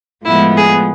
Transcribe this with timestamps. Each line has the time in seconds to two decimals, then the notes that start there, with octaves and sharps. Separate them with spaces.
0.24 A2 F3 G#3 B3 E4
0.57 G#4